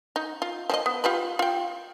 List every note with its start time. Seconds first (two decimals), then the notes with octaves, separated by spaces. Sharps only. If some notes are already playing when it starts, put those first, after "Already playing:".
0.16 D#4
0.42 F4
0.70 F3 G#4 D#5
0.86 B3
1.04 F4 G4 B4
1.39 F4 G5